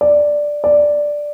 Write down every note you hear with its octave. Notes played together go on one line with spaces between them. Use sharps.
D5
D5